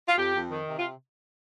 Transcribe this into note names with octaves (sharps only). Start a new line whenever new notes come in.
F4
F2 G4
F2
D#3
C3
F4